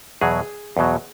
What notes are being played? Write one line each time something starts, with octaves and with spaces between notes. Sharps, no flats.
E2 B2 F#3 G#4
E2 B2 F#3